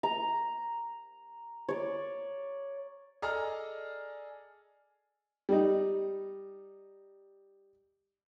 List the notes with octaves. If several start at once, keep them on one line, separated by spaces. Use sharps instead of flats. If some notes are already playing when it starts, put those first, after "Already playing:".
A#5
C#5 D5
G#4 A4 D5 D#5 A#5 F6
G3 D#4